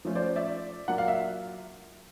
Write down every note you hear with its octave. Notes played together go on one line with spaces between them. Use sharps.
F3 A3 C#4 F4
C5 D5
D5 E5
F#3 A#3 D4 F4 F#5
F5
E5